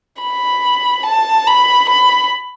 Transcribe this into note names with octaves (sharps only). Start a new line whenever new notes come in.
B5
A5
B5
B5